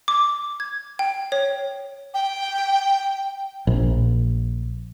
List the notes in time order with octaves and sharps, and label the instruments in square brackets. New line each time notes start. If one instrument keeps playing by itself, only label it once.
[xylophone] D6
G#6
G5
C#5
[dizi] G5
[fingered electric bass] A#1